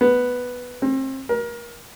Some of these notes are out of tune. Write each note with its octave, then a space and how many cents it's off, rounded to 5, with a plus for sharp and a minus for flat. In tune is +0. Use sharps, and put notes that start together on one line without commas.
B3 +0
C4 +35
A#4 +30